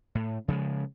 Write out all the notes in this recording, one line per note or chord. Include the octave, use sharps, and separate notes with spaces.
A2
C#3 F3 F#3 G#3